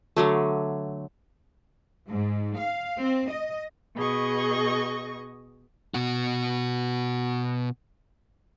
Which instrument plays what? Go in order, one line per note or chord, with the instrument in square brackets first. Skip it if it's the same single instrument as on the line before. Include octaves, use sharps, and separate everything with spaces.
[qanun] D3 F#3 A3
[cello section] G#2
F5
C4
D#5
[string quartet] B2 G#4 D#5 C#6
[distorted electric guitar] B2 F#4